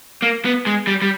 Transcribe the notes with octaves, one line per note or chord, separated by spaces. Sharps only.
A#3
B3
G#3
G3
G3